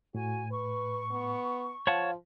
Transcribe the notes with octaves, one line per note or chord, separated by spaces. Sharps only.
A2 F#4 G#5
B4 C#6
B3
F3 C#5 F5 F#5 A5